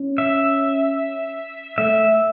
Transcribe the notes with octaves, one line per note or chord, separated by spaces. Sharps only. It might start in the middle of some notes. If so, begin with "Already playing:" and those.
Already playing: C#4
E5
A3 E5